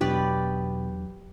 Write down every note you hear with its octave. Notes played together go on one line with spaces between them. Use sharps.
E2 B2 F#3 D4 G4 B4 D5